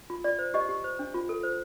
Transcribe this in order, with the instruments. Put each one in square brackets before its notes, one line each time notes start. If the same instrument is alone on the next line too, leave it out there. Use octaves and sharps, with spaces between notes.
[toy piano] F4
F4 D5
C5
G4 D#5
G4
C5
D4
F4
A4
C5